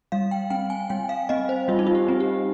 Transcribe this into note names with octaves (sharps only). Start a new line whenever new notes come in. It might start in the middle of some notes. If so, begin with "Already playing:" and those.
G3 F5
G5
C4 G5
G#5
G3 G5
F5
C4 D#5
C5
G3 F4
D#4
F4
G4
C4
G4